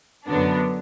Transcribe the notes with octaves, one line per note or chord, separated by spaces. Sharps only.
F#2 D3 F#3 B3 D4